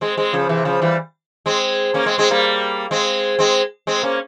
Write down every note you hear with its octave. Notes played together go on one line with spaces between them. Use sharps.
G#3 C4
G#3 C4
C#3 F3
C3 E3
C#3 F3
E3 G3
G#3 C4
A#3 C#4
G#3 C4
G#3 C4
G3 A#3
G#3 C4
G#3 C4
G#3 C4
A#3 C#4